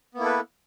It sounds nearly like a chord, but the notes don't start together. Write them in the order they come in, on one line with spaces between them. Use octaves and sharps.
B3 A#3 E4 A4 B4